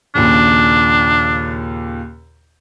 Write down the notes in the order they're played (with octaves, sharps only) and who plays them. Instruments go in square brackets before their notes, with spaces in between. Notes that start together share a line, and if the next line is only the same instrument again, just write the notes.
[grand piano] D#2 A#2 C#3 [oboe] D4